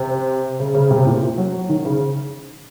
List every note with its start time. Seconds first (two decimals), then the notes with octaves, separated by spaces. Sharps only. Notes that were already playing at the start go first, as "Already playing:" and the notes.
Already playing: C3
0.60 C#3
0.75 C#3
0.91 C3
1.07 A#2
1.38 F#3
1.69 D#3
1.85 C#3